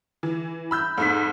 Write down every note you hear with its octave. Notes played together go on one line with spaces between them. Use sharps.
E3
B5 E6 G6
F2 G#2 B6